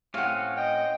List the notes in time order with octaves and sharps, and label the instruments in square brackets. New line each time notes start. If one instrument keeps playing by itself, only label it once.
[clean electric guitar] A2 C4 C#4 [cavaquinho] F5 F#5
[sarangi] D#5 [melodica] G5